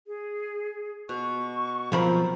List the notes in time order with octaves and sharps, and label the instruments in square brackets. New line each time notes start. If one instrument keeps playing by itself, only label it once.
[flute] G#4
[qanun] B2 [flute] C#6
[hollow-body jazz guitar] B1 F3 B5 [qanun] C4 F4 A#4